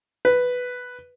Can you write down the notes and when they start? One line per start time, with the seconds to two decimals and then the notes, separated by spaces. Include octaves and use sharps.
0.25 B4